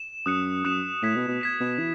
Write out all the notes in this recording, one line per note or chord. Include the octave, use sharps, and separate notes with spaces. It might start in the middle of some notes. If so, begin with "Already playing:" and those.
Already playing: E7
F#2 D#6 F#6 C#7 E7
F#2 D#6 F#6 C#7 E7
A2 G#6 B6 E7
B2
B2
G#6 B6 E7
B2
E3